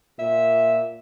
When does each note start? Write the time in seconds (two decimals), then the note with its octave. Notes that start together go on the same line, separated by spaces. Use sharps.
0.19 A#2 E5